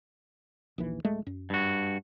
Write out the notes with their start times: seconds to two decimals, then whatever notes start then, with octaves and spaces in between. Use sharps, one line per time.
0.78 A#1 D#2 E3
1.05 D1 G#3 A3
1.26 F#2
1.50 G2 F#4